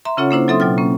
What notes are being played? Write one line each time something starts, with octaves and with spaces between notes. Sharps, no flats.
E5 A#5 C6
C#3 C#4 F4 A4 C#5 F#5
A#3 D4 E4 C5
F#3 C4 A4 E5 C6 D#6
B2 F#3 G5 F6
A#3 C#4